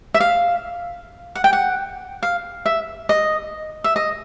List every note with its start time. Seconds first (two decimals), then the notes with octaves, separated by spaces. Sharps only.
0.14 E5
0.20 F5
1.35 F#5
1.44 G5
1.53 F#5
2.23 F5
2.66 E5
3.09 D#5
3.84 E5
3.96 D#5